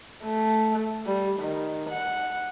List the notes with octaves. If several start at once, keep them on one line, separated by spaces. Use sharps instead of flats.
A3
G3
D#3
F#5